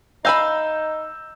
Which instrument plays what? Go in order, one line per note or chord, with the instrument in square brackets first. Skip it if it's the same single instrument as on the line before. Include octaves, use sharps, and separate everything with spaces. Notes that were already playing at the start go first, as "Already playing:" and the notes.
[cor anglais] D#4 [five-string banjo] F5 G#5 B5 [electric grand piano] E6 G6 A#6